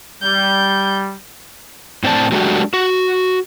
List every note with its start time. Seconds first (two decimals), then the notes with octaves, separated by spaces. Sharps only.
0.23 G3 G6
2.03 A2 C4 C5 D5 A5
2.32 F#3 G#3 A3 D4 F#4 G4
2.73 F#4